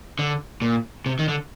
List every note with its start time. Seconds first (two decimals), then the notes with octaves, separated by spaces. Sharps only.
0.19 D3
0.62 A#2
1.06 C3
1.19 D#3
1.28 D3